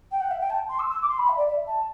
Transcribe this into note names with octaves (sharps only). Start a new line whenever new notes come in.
G5
F#5
E5
G5
A5
C6
E6
E6
D6
C6
B5
E5
D5
E5
A5